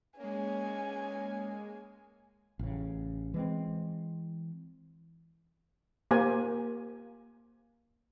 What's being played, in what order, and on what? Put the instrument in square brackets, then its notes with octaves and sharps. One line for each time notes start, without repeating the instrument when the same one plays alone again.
[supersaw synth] G#3 A#3 [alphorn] C#4 [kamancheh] G#5
[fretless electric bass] A1 C#3
E3 G#3 C4
[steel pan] A#3 G4 C5 G#5